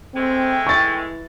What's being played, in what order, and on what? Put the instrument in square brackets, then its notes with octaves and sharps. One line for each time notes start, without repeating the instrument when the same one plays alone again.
[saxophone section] G#3 A3 E4 [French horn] C4 [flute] G5
[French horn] E3 [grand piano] C#6 A6